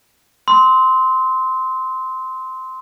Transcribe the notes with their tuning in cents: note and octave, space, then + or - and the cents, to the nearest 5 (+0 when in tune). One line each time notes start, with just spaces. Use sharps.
C6 -10 E6 -45